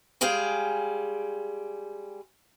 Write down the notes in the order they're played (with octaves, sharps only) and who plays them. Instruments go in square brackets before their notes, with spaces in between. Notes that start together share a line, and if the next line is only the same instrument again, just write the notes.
[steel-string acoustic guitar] G3 G#3 G#4 F5 G5